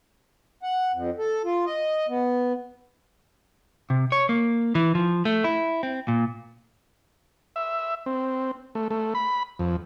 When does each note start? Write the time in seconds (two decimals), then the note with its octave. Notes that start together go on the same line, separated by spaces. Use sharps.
0.63 F#5
0.94 F2
1.18 A4
1.45 F4
1.66 D#5
2.08 B3
3.90 C3
4.12 C#5
4.29 A#3
4.75 E3
4.95 F3
5.25 A3
5.44 E4
5.83 C4
6.08 A#2
7.56 E5
8.06 C4
8.75 A3
8.91 A3
9.15 B5
9.59 F2